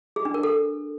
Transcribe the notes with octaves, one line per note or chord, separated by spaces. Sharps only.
G#4
D4
A#4
A4